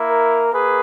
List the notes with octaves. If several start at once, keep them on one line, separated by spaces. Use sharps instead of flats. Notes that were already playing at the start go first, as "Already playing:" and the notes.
Already playing: A#3 E4
A#4
A#3 G#4 B4